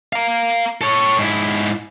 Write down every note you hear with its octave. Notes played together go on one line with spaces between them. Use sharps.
F5 A#5
A4 C#5
G#2 E4